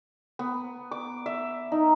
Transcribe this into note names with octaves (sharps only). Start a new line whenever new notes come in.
B3
D6
E5
D#4